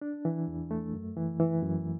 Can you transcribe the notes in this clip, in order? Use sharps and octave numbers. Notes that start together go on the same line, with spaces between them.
D4
E3
E2
A3
F#2
E3
E3
F#2